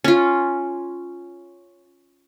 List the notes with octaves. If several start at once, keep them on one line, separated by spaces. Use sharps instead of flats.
C#4 F4